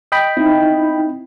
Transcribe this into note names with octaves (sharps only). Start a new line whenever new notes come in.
D#5 G5 B5
C4 D#4 E4